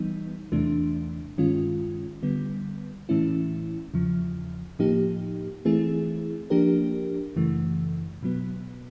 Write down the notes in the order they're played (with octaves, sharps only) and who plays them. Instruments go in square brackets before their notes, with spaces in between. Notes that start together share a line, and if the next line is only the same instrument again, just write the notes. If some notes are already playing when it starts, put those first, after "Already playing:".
Already playing: [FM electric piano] E3 G3 B3 D#4
E2 C3 E3 A3 D4
G2 D#3 G#3 C#4 F4
D3 G3 B3
A2 E3 A3 C#4 E4
E2 C#3 F3
A2 F3 A#3 D#4 G4
E3 A3 C4 E4 G#4
F3 A#3 D4 G4 A#4
F#2 C#3 E3 A3
B2 F#3 B3